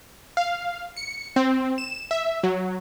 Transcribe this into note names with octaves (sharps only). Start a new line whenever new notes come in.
F5
C#7
C4
E7
E5
F#3